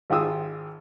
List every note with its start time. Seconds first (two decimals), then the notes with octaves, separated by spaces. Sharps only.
0.10 G#1 F4 G4 G#4 D#6 E6